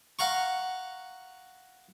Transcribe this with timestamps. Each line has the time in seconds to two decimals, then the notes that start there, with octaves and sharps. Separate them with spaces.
0.19 F5 F#5 A#5 C#6